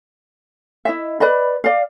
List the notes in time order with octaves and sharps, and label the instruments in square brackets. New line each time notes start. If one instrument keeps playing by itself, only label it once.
[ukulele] E4 D#5 E5
B4 D5 D#5 B5
D5 F5